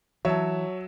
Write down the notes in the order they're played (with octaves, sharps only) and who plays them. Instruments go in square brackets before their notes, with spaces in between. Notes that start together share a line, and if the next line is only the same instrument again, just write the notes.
[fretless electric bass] E3 [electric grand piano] F#3 [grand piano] C#5 [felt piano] E5 A5